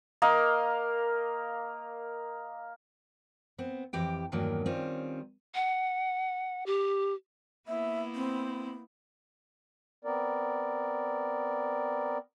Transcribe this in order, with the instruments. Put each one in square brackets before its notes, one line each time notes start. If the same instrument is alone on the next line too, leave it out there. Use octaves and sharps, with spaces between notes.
[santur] A#3 A#4 D#5 F5
[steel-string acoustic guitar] B3 C4
F2 E3 G4 G5
E2 G2 D#3 F#3 A#3
D#3 G3 C4 C#4 F4
[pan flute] F#5
G4
[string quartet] A#3 B3 E4 [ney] E5
[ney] C4
[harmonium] B3 C4 A#4 D5